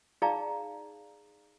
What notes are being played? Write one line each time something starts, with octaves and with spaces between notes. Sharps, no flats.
D#4 G#4 D5 F5 A5 A#5